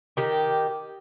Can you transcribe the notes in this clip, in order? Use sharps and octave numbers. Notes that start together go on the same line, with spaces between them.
D#3 G4